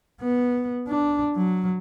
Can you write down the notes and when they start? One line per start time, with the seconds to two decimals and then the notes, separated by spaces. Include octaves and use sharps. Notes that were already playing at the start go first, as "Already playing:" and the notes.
0.21 B3
0.88 D4
1.36 F#3